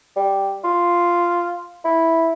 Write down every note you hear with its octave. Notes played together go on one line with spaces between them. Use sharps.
G3
F4
E4